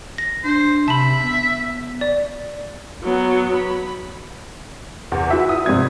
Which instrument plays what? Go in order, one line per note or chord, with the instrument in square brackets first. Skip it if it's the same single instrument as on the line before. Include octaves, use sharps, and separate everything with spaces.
[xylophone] A#6
[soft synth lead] D4 [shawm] C5
[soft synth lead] C3 [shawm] E5 [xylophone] A5 B5
[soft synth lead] B3
[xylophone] D5
[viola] F#3 B3
B5
[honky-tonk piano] E2
E4 F#4 E5
D#6
G#1 C3 G3 G#6